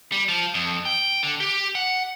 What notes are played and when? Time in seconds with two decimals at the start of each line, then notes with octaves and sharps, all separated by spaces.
0.12 G3
0.28 F3
0.54 F2
0.85 G5
1.23 D3
1.40 G4
1.75 F#5